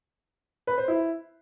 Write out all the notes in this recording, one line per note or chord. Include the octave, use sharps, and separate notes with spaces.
B4
C5
E4